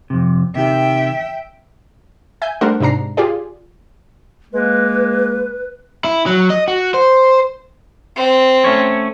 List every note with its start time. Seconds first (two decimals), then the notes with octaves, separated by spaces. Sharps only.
0.10 F2 C3
0.55 C3 D#3 G4 E5 G5
2.42 E5 G#5 G6
2.61 G3 A3 D4 A#4 C5 F#5
2.80 G#2 C3 D4 A#5 C7
3.17 F4 G4 G#4 D5
4.53 G#3 A#3 B4
6.04 E4
6.26 F#3
6.50 D#5
6.68 F#4
6.94 C5
8.16 C4
8.64 A3 C#4 C#5